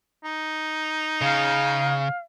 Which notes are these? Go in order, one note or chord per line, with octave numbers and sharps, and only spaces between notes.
D#4
C#3 F5